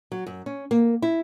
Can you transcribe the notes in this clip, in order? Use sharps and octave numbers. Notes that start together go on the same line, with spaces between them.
F#3
F#2
C#4
A#3
E4